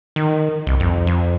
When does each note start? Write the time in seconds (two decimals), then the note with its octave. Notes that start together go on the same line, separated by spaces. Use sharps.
0.16 D#3
0.67 C2
0.80 F2
1.07 F2